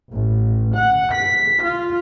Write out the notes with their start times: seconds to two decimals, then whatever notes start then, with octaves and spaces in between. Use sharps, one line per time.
0.12 A1
0.75 F#5
1.15 B6
1.64 F4